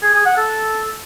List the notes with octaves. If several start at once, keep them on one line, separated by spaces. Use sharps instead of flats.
G#4
G#4
F#5
A4